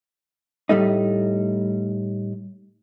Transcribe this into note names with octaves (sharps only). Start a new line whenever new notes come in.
A2 G3 A3 D#4